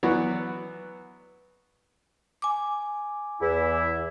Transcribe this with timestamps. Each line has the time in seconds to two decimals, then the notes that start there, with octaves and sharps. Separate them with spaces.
0.03 E3 F#3 B3 F#4 D5
2.42 G#5 D6
3.41 E2 E4